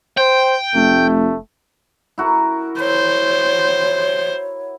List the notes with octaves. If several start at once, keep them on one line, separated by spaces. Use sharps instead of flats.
C5 G5
F1 A3
E4 F#4 A#4
C5 C#5